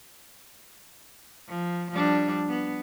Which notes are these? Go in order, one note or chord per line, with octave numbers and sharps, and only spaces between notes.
F3
F3 G3 D4
B3